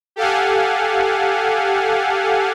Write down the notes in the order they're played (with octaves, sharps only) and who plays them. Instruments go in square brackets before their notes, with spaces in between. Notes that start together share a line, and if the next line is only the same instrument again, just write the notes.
[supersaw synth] G4 A4 F5 F#5 G#5